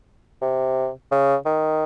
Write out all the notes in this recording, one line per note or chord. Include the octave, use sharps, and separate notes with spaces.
C3
C#3
D#3